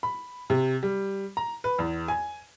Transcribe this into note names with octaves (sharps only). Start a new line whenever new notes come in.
B5
C3
G3
A#5
B4
E2
G#5